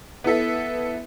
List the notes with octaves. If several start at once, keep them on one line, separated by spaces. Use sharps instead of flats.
B3 E4 A4 E5